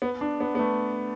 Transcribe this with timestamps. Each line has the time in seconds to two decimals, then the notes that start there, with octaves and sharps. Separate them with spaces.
0.02 B3
0.21 D4
0.40 B3
0.55 B3
0.59 A3